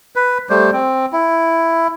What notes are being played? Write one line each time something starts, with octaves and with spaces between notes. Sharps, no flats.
B4
G3 A3 C5
C4
E4